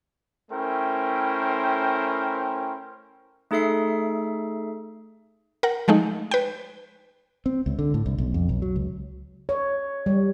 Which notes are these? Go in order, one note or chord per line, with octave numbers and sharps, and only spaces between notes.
A3 C#4 E4 A#4 C5 G5
A3 D#4 G#4 A4 E5 C7
A#4 F#5
F3 G#3 A3 D#4
B4 G5
C4
C#2
D3
A2
C2
B1
F2
B1
F#3
C#2
C#5
G3